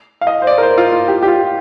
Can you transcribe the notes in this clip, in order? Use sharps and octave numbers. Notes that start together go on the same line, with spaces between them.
F5
D#5
C5
D5
A#4
C5
F4
F4
G4
G4
F4